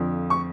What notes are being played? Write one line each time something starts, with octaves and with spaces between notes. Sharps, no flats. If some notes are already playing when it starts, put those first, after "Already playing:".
Already playing: F2 D3 F3
C#6